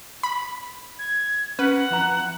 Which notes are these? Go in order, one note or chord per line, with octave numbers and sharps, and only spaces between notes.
B5
G#6
C#4 A#4 B4 F#5
F2 E4 A#5